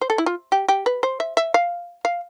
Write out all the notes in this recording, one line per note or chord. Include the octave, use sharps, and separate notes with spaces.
C5
A4
E4
F4
G4
G4
B4
C5
E5
E5
F5
F5